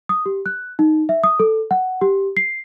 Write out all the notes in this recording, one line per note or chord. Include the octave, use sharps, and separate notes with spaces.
D#6
G4
F#6
D#4
E5
D#6
A4
F#5
G4
C7